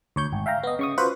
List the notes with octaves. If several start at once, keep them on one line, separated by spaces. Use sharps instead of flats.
D2 C#5 G6
G#1
E5 F5 G5 A#5
B3 D#5
C#3 C#6 D#6
F4 F#4 B4 C5 F#5 B5